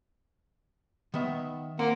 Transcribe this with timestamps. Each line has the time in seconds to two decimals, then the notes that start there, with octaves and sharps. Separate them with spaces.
1.14 D#3 B3 E5
1.79 A#3 C4 F#5